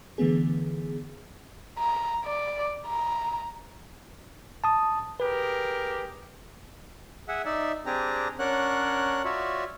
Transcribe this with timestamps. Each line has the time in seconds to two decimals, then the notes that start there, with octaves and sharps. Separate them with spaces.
0.18 D3 E3 A3 B3 G#4
1.79 A#5
2.25 D5
2.87 A#5
4.64 A5 D#6
5.20 G4 G#4 A#4 B4
7.28 G#4 E5 F#5
7.45 D#4 D5 E5
7.86 C4 D4 G4 G#4 A#5
8.39 C#4 D4 A#4 C#5 F#5 F#6
9.24 F4 F#4 C#5 D5 E5